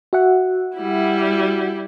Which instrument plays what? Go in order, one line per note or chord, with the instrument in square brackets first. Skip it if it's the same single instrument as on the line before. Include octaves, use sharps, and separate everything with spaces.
[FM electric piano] F#4 E5 F#5
[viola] G3 E4